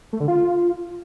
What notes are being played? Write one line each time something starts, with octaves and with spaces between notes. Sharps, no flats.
A3
D3
F4